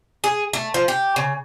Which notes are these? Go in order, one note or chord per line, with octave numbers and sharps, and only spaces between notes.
G#4
A3
F3
G4
C#3